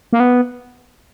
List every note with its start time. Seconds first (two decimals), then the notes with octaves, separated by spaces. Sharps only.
0.13 A#3
0.20 B3